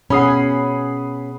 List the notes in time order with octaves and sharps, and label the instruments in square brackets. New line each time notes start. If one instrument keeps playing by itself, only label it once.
[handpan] B2 G#4 F#5 [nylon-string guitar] C#4 [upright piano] B5 D#6 C7